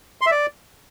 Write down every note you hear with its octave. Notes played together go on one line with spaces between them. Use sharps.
C6
E5
D5